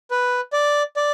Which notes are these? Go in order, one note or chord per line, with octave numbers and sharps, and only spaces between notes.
B4
D5
D5